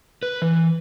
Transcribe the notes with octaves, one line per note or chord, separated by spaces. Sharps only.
B4
E3